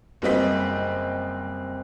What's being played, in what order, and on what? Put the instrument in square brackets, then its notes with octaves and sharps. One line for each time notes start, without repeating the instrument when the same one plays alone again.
[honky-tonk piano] F#1 G3 C4 D#5 B6